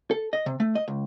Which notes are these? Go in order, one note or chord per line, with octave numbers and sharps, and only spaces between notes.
A4
D#5
C3
A3
D#5
C#2